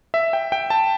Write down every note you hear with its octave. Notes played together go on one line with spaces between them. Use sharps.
E5
G5
G5
A5